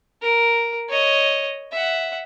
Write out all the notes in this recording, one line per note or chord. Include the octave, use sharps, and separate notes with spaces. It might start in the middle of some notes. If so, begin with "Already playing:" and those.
A#4
C#5 D#5
E5 F#5